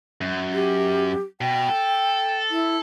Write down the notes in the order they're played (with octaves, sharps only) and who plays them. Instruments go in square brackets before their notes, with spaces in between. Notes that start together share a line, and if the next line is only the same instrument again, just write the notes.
[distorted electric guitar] F#2
[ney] G4
[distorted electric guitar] B2 [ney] G5
[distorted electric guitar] A4
[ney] E4